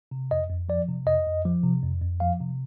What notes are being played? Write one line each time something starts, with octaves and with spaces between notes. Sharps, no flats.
C3
F2 D#5
F2
F3 D5
C3
F2 D#5
F2
F3
C3
F2
F2
F3 F5
C3